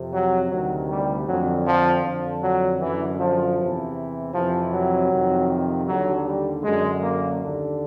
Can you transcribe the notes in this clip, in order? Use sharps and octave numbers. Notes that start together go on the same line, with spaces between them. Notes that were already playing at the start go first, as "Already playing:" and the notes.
Already playing: F2 C3
F#3
D2 C3 D#3 F#3
G3
F2 D3 F#3
F3
F2 D3 F3
F#3
F#2 D3 E3
F3
E2 C3 E3
F2 C3 E3 F3
F#3
F2 C3 D#3
D#2 D3 F#3
G3
F#2 D3 G#3
A#3
D#2 D3